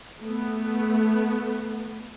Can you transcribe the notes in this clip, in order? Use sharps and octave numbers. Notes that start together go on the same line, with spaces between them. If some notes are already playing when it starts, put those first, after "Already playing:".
A3 B3